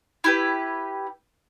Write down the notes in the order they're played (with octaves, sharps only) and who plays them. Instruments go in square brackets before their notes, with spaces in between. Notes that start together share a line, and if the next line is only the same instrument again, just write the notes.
[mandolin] E4 G4 B4